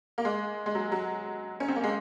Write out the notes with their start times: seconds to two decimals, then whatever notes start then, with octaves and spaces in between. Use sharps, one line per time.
0.18 A#3
0.25 G#3
0.66 G#3
0.75 F#3
0.92 F#3
1.60 C#4
1.68 C4
1.76 A#3
1.84 G#3